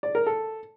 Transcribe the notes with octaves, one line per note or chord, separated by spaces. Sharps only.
D5
A#4
A4